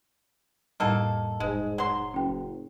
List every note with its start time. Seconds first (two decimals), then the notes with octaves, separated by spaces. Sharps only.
0.80 F2 A2 G3 A#3 D#4 A4
1.40 E1 G#2 G#3
1.78 F#3 C6
2.14 F#1 C#4 G5